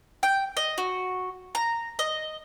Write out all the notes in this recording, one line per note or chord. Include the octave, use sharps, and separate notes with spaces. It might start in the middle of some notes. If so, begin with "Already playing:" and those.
G5
D#5
F#4
A#5
D#5